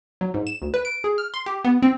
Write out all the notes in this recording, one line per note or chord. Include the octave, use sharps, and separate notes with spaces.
F#3
G#2
E7
D2
B4
D7
G#4
F6
C6
G4
B3
C4